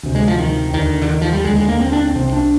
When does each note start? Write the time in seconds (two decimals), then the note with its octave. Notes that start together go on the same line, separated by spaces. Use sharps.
0.03 D2 C3
0.15 G#3
0.28 F3
0.39 D#3
0.74 D#2 D3 D#3
1.02 D3
1.09 D#3
1.22 F3
1.33 G3
1.44 D#2 D3 G#3
1.56 G#3
1.68 A#3
1.81 C4
1.92 D4
2.03 C4
2.15 C2 C3 C4
2.33 D4